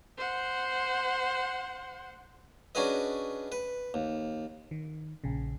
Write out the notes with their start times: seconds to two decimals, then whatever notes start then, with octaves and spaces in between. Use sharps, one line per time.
0.17 C5 F#5
2.75 C#4 D4 F#4 G#4 B4 D#5
3.52 B4
3.94 D#2
4.71 D#3
5.24 A#1 C#3